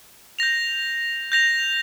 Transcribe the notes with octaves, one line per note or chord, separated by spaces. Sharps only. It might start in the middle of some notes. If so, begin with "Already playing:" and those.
G6 A#6 F7
G6 A#6 F7